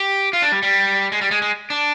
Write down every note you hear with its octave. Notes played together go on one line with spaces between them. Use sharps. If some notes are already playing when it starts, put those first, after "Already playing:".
Already playing: G4
F4
D4
G3
G3
G#3
G3
G#3
G#3
D4